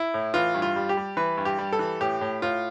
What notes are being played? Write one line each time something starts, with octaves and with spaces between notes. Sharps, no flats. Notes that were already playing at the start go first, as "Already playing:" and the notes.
Already playing: E4
A2
E3 F4
G2
F4
G3
G4
G3
E3 B4
G2
G4
G3
A4
E3
A2 G4
A2
A2 F4